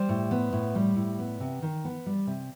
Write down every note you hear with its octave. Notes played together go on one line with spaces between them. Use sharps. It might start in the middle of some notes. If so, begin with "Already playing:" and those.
Already playing: G3 C5
A2
B3
A2
G3
A2
B3
C3
D#3
B3
G3
C3